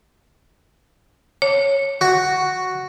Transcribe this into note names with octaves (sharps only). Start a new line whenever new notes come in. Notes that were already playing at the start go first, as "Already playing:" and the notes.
C#5
F#4